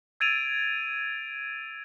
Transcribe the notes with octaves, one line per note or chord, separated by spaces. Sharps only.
E6 G#6 A6 D7 D#7 F7